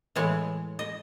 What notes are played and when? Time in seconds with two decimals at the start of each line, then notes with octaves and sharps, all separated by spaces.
0.15 A2 E3 G#3 C#5
0.79 D#5